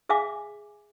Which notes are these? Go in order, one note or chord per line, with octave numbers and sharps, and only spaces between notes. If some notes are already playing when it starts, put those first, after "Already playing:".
G#4 E5 F5 G#5 D6